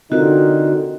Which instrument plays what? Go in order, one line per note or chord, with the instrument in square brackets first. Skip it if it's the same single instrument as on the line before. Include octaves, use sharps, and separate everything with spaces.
[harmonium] D3 [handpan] C4 F4 A#4 [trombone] D#4 [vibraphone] F#4